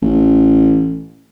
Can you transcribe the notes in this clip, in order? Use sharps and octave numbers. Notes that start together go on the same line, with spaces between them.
A1